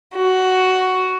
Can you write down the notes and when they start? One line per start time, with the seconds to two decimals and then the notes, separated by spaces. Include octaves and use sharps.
0.14 F#4